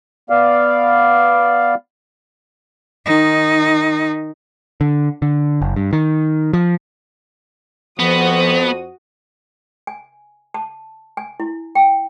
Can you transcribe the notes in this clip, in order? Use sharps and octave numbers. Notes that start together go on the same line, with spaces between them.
B3 D5 F5
D#3 D#4
D3
D3
F#1
G2
D#3
F3
F2 F3 B3 F#4 C5 D#6
G#5
A5
G#5
E4
G5